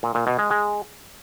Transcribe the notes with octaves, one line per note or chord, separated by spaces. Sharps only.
A#2
A#2
B2
G#3
G#3